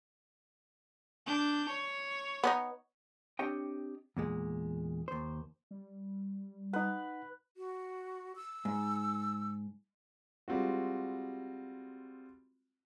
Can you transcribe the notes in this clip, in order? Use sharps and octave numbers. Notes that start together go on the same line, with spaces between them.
D4 G6
C#5
B3 C#4 D#4
C4 D4 G4 C#5 D#5 G5
E2 A#2 G#3
D#2 C5
G3
D#4 B4 F#5
F#4
E6
G#2
G3 G#3 C4 F4 F#4